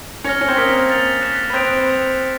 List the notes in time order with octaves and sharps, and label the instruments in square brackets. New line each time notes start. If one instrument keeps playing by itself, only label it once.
[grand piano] C#4 C#5 [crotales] F6 A#6 C#7
[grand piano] C#4 C#5
C4 C5
[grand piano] A#3 A#4 [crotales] D#6 F#6 B6
[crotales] A6 C#7 F7
F#6 B6 E7
[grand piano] B4
[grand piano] C4 C5 [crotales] D#6 G#6 B6 D7 F7